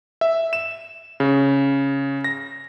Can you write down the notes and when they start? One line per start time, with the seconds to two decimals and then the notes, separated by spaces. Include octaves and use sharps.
0.21 E5
0.53 E7
1.20 C#3
2.24 A#6